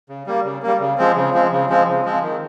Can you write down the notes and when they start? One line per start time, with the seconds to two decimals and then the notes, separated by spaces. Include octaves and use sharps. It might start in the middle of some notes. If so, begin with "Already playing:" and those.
0.09 C#3
0.26 G3 A#3
0.44 C#3
0.63 G3 A#3
0.80 C#3
0.98 F3 G#3 C4
1.16 C#3
1.33 F3 G#3 C4
1.51 C#3
1.69 F3 G#3 C4
1.87 C#3
2.05 F3 G#3 C4
2.23 D#3